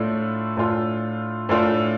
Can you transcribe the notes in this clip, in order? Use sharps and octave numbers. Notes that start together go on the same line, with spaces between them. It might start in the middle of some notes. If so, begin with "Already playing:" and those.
Already playing: A2 A3 D4 F4
A2 A3 D4 F4
A2 A3 D4 F4